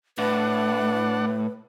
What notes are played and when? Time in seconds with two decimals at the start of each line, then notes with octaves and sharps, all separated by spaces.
0.18 A2 D4 B4 F#5